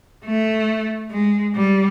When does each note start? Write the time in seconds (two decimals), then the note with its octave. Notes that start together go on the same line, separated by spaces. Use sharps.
0.25 A3
1.11 G#3
1.55 G3